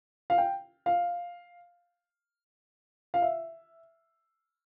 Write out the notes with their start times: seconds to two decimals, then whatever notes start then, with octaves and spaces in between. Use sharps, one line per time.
0.30 F5
0.38 G5
0.86 F5
3.14 F5
3.22 E5